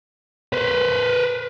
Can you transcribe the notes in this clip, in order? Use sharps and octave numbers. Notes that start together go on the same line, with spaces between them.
B4 C5